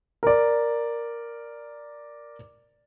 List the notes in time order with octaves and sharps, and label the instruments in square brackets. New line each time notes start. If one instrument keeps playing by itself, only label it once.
[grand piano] A#4 D5